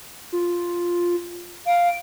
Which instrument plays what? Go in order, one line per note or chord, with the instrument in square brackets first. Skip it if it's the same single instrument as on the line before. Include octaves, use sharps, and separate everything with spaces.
[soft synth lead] F4
[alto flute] F5 [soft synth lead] D7